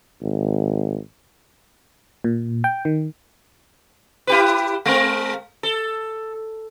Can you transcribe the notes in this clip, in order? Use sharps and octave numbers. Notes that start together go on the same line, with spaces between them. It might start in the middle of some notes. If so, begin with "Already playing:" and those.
G#1
A#2
G5
D#3
E4 G4 B4
G#3 C4 A#4
A4